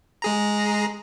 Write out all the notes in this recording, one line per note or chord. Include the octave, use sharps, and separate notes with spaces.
G#3 G#4 A#5